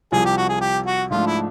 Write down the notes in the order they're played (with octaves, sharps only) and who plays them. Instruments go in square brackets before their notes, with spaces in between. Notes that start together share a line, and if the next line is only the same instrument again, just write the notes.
[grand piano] C2 C3 F3 [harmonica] G#4
[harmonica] G4
F#4
G#4
G4
F#4
[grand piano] G#2 F3 A3 D4 [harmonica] F4
[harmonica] E4